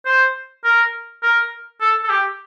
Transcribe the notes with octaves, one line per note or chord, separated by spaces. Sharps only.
C5
A#4
A#4
A4
A4
G4